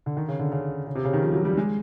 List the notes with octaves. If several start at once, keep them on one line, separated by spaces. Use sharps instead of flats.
D3
D#3
C#3
D3
C#3
C#3
C3
C#3
D#3
F3
F#3
G3
G#3